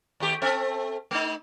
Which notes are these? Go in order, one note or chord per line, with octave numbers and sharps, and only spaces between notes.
D#2 A3 G4
C4 A4 E5
A3 D#4